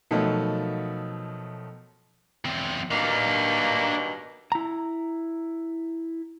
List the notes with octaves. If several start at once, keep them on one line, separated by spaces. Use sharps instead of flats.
B2 D#3 F3 F#3 A3
E2 C4
G2 B2 D#3 A#3 D4 F5
E4 A#5